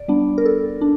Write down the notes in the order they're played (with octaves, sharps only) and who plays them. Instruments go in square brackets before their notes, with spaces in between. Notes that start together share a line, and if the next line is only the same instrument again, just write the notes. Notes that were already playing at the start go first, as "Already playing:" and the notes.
Already playing: [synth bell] D5
G3 B3 D4
A#4
A4
D4